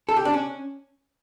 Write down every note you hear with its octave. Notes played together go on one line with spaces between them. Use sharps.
A4
G4
D4
C#4